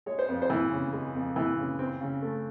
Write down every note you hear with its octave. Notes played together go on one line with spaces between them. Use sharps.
G#3 C#5
C5
F2 B4
C5
E3
C#3
G#3
F2
E3
C#3
C4
C#3
A3